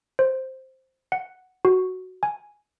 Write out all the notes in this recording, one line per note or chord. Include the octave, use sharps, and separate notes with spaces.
C5
F#5
F#4
G#5